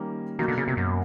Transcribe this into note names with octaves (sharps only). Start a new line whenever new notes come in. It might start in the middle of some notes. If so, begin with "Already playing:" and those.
Already playing: D#3 G3 A#3 C#4
B2 D#3 F#3 A#3
D3
C#3
C3
F#2